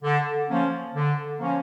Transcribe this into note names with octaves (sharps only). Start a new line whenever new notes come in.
D3
F3 A#3 C#4
D3
F3 A#3 C#4